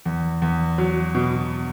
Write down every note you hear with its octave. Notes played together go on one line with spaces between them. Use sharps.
E2
E2
F#3
B2